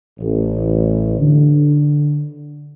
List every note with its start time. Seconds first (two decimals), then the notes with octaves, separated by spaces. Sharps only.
0.19 A1
1.19 D3